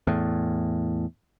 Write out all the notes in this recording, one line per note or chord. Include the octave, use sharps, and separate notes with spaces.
E2 A2